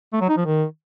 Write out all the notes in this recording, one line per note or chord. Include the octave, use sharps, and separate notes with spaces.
A3
F#3
D#4
F3
D#3